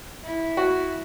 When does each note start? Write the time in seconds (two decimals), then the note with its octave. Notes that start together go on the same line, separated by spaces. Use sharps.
0.24 E4
0.57 F#4